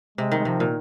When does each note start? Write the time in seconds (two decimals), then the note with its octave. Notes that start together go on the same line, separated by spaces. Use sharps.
0.18 C3 G#3
0.32 D#3
0.38 G#3
0.45 C3 F3
0.60 A#2